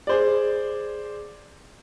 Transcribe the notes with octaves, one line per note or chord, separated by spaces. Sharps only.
G#4 C5 D5